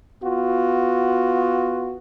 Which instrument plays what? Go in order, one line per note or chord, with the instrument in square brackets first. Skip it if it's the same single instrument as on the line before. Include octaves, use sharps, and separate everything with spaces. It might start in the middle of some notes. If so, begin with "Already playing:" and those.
[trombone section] B3 F4 F#4